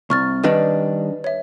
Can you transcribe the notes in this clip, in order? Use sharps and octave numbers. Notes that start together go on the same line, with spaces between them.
C2 C#6 F6 A6
D#3 G3 D4 B4 D#5
C#5 E5